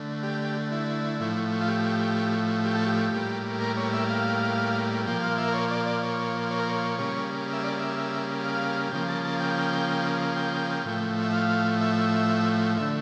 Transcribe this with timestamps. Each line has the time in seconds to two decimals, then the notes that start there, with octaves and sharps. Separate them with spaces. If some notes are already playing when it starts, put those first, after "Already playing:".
Already playing: D3 A3
0.23 G4
0.72 E4
1.20 A2 F3 A3
1.61 F4
1.68 G4
2.65 G4
2.75 A4
2.86 G4
3.13 A2 G3 A#3
3.61 A#4
3.77 C#5
3.93 E5
4.09 F5
5.06 A#2 F3 A#3 G5
5.21 F5
5.37 E5
5.48 A#4
5.54 C#5
5.71 D5
5.86 D5
6.02 C#5
6.51 C#5
6.59 A#4
6.69 C#5
6.99 C#3 G3 A#3
7.53 E5
7.63 D5
7.79 E5
8.44 F5
8.92 C#3 F3 A#3 G5
9.08 A5
9.24 A5
9.40 G5
10.36 G5
10.85 A2 F3 A3
11.23 E5
11.33 F5
11.81 E5
12.77 D3 A3 E5